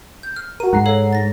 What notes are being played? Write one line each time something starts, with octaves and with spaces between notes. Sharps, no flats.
G6
F6
F#4 A#4 D#7
G#2 F#5 A#5 C7
A4 C#5 F5
A6 A#6